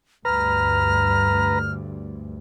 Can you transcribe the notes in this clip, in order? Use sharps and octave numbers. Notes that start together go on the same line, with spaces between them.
D2 G2 B4 A#5 F6